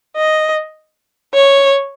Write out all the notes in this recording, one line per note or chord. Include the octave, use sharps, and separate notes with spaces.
D#5
C#5